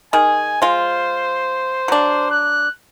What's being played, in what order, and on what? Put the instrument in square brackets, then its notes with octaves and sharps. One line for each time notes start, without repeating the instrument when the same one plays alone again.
[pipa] D#3 G#4 [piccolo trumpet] G#5
[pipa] G#3 F4 [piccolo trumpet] C5
[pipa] F#3 D4
[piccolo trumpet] F#6